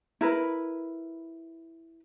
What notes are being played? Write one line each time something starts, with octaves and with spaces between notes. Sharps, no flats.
E4 A#4 B4